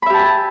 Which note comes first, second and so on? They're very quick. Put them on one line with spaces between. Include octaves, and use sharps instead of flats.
B5 E5 G4 A5 G#5